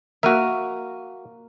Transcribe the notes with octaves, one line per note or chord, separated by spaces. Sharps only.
A#3 F#4 E5 F6 D#7